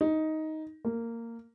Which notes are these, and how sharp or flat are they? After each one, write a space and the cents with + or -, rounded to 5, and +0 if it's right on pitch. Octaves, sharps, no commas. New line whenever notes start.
D#4 +10
A#3 -15